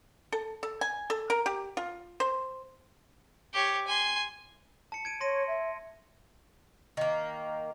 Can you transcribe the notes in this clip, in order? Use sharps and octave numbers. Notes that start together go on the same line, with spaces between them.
A4
A4
G#5
A4
A#4
G4
F4
C5
G4 C#5
G#5 C6
A5 C#7
G#6 D7 D#7
C#5 C6 A#6 D#7
E5
D#3 A#3